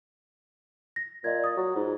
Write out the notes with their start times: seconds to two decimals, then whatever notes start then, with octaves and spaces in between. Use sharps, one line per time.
0.96 A#6
1.24 A#2 D5 D#5 G#6
1.44 D#6 A6
1.57 F#3
1.76 G#2 F4